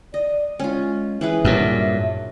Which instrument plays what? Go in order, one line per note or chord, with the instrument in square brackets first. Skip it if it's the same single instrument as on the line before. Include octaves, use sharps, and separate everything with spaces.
[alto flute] D5 [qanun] D#5
[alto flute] G#3 [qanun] C#4 F4
[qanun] E3 G#4 B4 [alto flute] E5
[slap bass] G2 A#2 [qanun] F#3 A#4